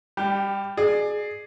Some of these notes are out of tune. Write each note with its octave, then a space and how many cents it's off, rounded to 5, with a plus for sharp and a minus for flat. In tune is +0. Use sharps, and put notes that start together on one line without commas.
G3 +25 G4 +0
G#4 +10 D5 +30